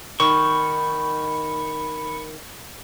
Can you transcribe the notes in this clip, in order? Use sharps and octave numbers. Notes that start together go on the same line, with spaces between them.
D#3 B5 C#6